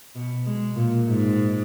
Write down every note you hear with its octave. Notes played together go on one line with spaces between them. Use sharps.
B2
G#3
A#2
G#2